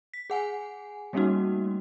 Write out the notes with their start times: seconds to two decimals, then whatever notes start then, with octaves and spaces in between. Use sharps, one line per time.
0.14 B6
0.30 G#4 F#5 G#5
1.13 G3 A3 A#3 C#4 D#4 F#4